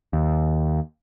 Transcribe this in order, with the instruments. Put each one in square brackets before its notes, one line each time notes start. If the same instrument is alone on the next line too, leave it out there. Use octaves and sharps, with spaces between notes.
[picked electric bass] D#2